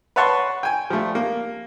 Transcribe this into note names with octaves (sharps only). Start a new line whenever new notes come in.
B4 C#5 F#5 A5 C6 C#6
G5 G#5
F3 G3 A3
A#3